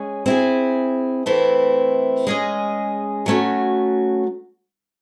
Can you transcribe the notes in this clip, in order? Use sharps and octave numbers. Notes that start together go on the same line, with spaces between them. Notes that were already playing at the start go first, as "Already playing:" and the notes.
Already playing: G#3 C#4 G#4
C4 E4 G#4
E3 A3 C4 E4
G#3 C#4 G#4 D#5
F#3 A3 C#4 F#4